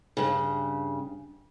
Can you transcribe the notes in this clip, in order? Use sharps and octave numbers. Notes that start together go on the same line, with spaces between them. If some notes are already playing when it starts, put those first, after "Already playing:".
G2 C#3